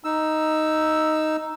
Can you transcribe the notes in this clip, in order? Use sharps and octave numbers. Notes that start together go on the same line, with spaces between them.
D#4 E6